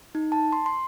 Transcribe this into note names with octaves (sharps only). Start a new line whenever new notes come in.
D#4
A5
C6
C6